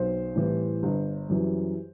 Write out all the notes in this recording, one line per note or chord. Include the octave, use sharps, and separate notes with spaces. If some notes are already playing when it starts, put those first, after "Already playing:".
Already playing: B1 C5
A2 E3 G3
G1
F#2 E3 G3